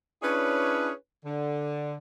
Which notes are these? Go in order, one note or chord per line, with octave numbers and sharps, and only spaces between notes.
C#4 D4 E4 G#4 B4 C#5
D3